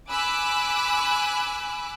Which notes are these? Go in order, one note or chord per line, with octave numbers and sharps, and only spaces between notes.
G#5 B5 D6 E6 F#6